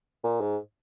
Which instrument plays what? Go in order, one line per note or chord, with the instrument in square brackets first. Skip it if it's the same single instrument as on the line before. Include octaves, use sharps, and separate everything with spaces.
[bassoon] A#2
G#2